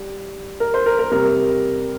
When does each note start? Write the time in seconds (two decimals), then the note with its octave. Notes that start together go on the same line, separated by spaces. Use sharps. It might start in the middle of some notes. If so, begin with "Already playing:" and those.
Already playing: G3
0.60 A#4
0.74 C5
0.86 A#4
0.99 A#4
1.12 C3 G3 A#4